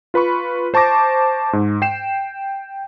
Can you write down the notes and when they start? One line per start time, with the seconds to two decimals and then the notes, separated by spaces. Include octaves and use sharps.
0.14 F4 B4 B5 C#6
0.74 C5 A5 C#6 D6 A#6
1.53 G#2
1.82 G5 C7 E7